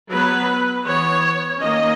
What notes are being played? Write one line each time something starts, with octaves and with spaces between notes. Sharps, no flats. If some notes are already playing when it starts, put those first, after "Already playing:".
F#3 B3 B4
E3 B3 C#5
D#3 A#3 C#4 D#5